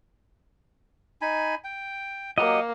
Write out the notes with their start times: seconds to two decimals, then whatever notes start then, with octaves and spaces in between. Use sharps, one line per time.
1.21 D#4 G#5 B5
1.64 G5
2.38 F#3 A#3 G4 D#5 F#5